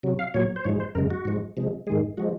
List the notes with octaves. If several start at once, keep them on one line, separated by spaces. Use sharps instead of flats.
C3 F#3
F5
A#2 F#3 C#5
C5
G#2 F3 G#3 C#5
C5
F#2 C#3 G#3 A#4
F#4
G#2 F3 G#3
C3 F3 G#3
G#2 D#3 G#3 G#4
F3 G#3 F#4